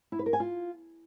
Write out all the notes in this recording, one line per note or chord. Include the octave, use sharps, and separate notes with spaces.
E4
B4
A#4
G#5
F4